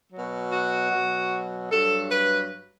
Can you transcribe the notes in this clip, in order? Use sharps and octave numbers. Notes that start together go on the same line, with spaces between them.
B2 F#3
F#4
B2 F#3
G2 F#3 A4
B4